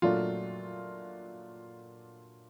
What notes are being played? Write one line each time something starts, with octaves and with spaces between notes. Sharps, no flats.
A#2 F#3 A3 D4 F4